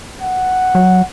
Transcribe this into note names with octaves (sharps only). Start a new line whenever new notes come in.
F#5
F#3